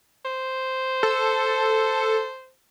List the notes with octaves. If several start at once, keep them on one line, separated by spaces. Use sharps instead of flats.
C5
A4